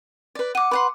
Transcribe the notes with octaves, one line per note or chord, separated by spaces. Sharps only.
B4 D5
F#5 D6 D#7
B4 F#5 C6